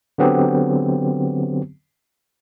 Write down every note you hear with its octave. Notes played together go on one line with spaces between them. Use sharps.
D3 F#3 B3 C4 G4